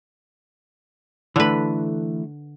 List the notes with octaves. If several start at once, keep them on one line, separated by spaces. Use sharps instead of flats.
D3 E3 A3 B4